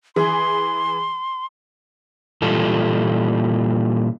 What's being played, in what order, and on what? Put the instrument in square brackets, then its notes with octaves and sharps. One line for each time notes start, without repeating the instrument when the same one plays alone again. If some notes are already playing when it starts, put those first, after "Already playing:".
[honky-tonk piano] E3 G#4 [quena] C6
[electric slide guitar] A#2 E3 G3 F4 A4